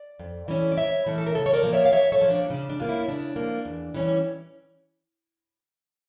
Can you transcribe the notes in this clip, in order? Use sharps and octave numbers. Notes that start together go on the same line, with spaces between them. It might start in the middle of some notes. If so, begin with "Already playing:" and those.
Already playing: D5
F2
E3 A3 C#4
D5
F2 C#5 E5
E3 A3 C#4
A4
A#4
C#3 A4 C#5
C#5
A#4 D5
F3 A#3
C#5 E5
F5
C#3 C#5 E5
A4 C#5
F3 A#3
D4
C#3 D4
D4
F3 A#3 F4
C#4 E4
C#4
C#3 D4
F3 A#3
E2
E3 G3 C#4